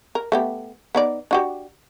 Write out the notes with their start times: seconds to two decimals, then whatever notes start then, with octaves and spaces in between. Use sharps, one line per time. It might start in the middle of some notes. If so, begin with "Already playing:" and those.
0.15 A#4
0.32 A3 B3 G4
0.95 B3 D#4 D5
1.31 D4 F#4 G4